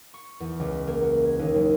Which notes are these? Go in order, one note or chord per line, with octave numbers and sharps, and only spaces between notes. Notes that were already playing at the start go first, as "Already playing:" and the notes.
C#6
E2
C#2
A#3
F#4
G#6
D#2
F#1